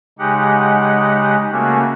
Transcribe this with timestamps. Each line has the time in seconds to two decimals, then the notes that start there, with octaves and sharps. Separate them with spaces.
0.19 C#3 G#3 D#4 G4 F#5
1.52 C#3 A3 A#3 C#4 F#4